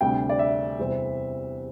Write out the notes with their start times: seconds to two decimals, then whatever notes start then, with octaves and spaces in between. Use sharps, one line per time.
0.01 D2 C3 G3 G5
0.29 D5
0.39 E5
0.79 E2 C3 G3 C4